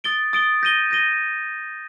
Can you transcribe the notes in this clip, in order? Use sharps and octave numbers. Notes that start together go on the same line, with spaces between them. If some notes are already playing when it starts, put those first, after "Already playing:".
D#6 A6 D7 G7
D#6 A6 D7 G7
G6 A#6 D#7 G7
G6 A#6 D#7 G7